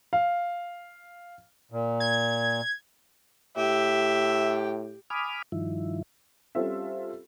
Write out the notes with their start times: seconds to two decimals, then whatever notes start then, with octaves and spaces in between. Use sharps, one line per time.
0.13 F5
1.72 A#2
2.00 G#6
3.57 A2 G4 E5
5.10 G#5 B5 D6 D#6 F6
5.52 G2 D#3 F3 E4
6.55 G3 C4 C#4 F4 A4 E5